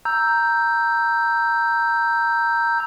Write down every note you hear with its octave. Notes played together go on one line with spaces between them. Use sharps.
A#5 E6 G6